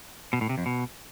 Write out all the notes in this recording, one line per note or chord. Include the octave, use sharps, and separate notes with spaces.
B2
A2
C3
F2
B2